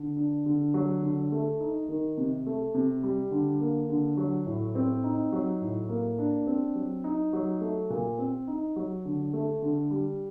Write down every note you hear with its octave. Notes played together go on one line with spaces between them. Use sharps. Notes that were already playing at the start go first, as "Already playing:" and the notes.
Already playing: D3
D4
D3
F#3
D3
A3
D#4
D#3
C3
A3
C3
G3
D3
A#3
D3
F#3
A2
C4
D#4
F#3
A2
A#3
D4
C4
F#3
D#4
F#3
A3
A#2
C4
D#4
F#3
D3
A3
D3
G3